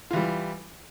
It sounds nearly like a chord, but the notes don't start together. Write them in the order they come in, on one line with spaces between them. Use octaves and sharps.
F4 E3 G3